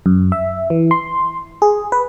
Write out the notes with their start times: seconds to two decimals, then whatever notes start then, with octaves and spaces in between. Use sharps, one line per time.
0.06 F#2
0.32 E5
0.70 E3
0.91 C6
1.62 G#4
1.92 B4